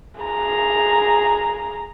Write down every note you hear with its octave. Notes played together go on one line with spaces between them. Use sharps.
G#4 A#5